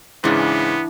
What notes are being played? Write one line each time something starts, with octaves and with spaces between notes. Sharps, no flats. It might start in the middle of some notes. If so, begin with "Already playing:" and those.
G#2 C#3 E3 B3 D4